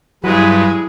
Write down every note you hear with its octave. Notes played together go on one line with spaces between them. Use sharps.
G2 F#3 G#3 E4 G#4 B4